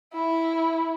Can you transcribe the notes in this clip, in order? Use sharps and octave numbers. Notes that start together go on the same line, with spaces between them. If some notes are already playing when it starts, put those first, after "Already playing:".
E4